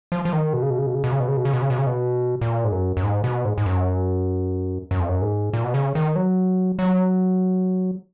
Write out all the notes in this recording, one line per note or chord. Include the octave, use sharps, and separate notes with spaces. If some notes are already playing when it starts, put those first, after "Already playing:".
F3
F3
D#3
B2
C#3
B2
C#3
B2
C#3
B2
C#3
B2
C#3
B2
C#3
B2
C#3
B2
C#3
B2
A#2
G#2
F#2
F#2
G#2
B2
G#2
G#2
F#2
F#2
F2
F#2
G#2
A#2
B2
C#3
D#3
F#3
F#3